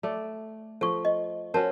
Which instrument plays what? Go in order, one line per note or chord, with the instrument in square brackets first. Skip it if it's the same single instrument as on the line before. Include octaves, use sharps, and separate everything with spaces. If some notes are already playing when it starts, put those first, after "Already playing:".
[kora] A3 D5
[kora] F3 [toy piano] A4 C#6
[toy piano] D#5
[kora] C#4 F#4 C5 [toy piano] A#4 A5